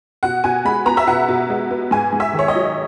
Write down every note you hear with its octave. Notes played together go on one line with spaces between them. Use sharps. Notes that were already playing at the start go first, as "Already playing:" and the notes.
B2 F#5
B2 G#5
G#3 B5
B3 A#5
E5
B2 F#5
B2
G#3
B3
G#2 G#5
G#2
E5
D#3
C#5
D#5
F#3